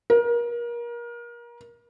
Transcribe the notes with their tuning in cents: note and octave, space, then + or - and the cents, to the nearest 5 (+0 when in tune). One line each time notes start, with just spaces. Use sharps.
A#4 +30